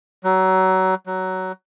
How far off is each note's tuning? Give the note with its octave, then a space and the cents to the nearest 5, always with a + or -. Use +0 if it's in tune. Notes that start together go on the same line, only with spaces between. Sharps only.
F#3 +25
F#3 +15